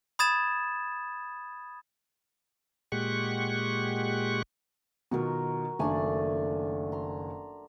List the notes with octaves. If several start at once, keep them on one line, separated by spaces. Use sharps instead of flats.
B5 D#6 G#6 A6 E7
A#2 G#3 G4 F#5 C#6
B2 D#3 F#3 F4 F#4 A#4
F#1 D#3 A3 D4 D5 G#5
A#5 C6